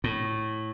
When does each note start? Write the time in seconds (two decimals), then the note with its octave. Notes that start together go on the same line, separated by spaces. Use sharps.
0.04 A2